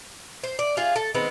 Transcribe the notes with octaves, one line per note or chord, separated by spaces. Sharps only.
C5
D5
F4 G#4 F5
A4
D#3 G#3 B3 C4